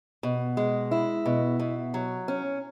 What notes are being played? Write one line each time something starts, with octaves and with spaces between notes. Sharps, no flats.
B2
G#3
E4
B2
B2
F#3
C#4